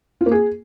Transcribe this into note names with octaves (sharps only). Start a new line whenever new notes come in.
F4
A#3
G#4